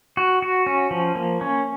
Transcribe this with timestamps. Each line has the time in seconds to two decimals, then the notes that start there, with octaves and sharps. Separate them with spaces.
0.17 F#4
0.42 F#4
0.67 C#4
0.91 F3
1.15 A#3
1.41 C#4